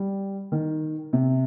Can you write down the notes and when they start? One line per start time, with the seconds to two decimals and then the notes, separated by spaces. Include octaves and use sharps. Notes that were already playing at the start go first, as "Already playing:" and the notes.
Already playing: G3
0.52 D#3
1.13 C3